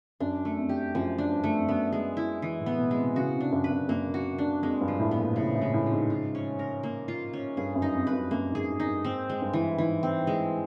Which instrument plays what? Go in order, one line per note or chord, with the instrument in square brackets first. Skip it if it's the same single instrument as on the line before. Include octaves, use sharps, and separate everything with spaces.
[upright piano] F#2 [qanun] D4
[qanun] A3
[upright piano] F2
[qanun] G4
[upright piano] F#2 [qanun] F3
[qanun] D4
[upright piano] G2
[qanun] A3
[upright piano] F2
[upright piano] F#2 [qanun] B3
[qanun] G#3
E4
E3
[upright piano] A2
[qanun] B3
[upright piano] B2
[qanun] G#3
[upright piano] C3
[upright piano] C#3 [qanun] F#4
[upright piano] C3
[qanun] D4
[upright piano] F#2
[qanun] B4
[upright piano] F#2
[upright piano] F#2 [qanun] A#3
[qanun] F#4
D4
[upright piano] F2 [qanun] G#3
[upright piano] G2
[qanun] F3
[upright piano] A2
[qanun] B3
[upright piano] A#2
[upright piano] A2 [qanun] C#3
[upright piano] A2
[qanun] G#3
[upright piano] A2
[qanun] F3
[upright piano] G#2
[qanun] F4
C#4
A#4
A#3
F4
C#4
[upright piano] G2 [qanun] G#4
[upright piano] F#2
[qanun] D#4
[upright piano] F2
[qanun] B4
[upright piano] F#2
[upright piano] F#2 [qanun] A#3
[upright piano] G#2 [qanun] G#4
[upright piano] G#2
[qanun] D#4
[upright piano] G2
[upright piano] G#2 [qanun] C4
[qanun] G#3
[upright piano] G2
[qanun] E3
[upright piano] G#2 [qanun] E3
[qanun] C4
G#3